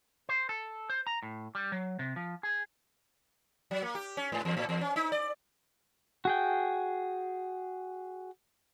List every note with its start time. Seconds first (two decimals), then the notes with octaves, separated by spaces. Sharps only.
0.29 C5
0.49 A4
0.90 C5
1.07 A#5
1.23 A2
1.55 G3
1.72 F#3
1.99 C3
2.16 F3
2.43 G#4
3.71 F#3
3.83 A#3
3.95 G4
4.17 C#4
4.32 G#2
4.45 E2
4.57 A2
4.69 E2
4.81 C#4
4.96 D#4
5.12 D5
6.25 F#4 G#4 G5